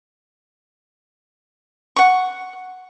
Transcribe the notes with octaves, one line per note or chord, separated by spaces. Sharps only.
F#5 C#6